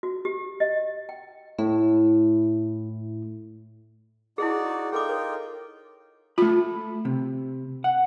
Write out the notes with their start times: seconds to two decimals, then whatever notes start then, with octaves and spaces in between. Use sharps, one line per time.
0.03 F#4
0.25 G4
0.60 D#5
1.09 G5
1.59 A2 E4
4.38 D#4 E4 F#4 G#4 D5
4.92 D#4 F4 G#4 A4 G5 D6
5.09 A#4 C#5
6.38 A3 F4 B5
7.05 C3
7.84 F#5